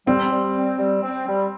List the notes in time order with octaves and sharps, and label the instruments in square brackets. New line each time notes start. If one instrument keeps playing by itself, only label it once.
[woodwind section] G3 [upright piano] C4
[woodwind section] G3
C4
G3
C4
G3